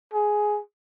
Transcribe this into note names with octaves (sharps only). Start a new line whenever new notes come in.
G#4